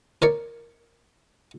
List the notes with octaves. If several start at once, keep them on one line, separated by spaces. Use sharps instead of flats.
A#4 C#5 D5